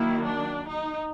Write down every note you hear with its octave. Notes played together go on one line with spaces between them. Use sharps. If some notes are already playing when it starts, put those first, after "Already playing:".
Already playing: D#3 F#3 A#3 E4
D4
D#4